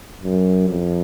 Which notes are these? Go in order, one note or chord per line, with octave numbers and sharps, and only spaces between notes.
F#2
F2